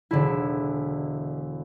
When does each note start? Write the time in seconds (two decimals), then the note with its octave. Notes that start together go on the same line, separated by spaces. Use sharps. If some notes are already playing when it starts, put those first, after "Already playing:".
0.11 E1 D3 E4